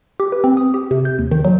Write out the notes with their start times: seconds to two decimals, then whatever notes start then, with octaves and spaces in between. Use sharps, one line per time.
0.20 G4
0.32 B4
0.44 C4
0.57 D#6
0.74 G4
0.91 C3
1.05 G6
1.19 D#2
1.31 D#3
1.45 F#3